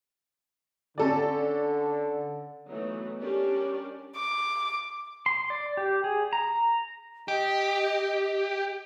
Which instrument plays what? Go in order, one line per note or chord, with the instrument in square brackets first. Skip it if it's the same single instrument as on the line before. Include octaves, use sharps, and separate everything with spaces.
[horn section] D3 [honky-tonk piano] C#4 A4 D5
[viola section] E3 F#3 A3 B3 D#4
G3 C#4 D4 G4 A#4 D5
[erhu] D6
[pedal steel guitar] C6
D5
G4
G#4
A#5
[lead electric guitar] G4 [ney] D#5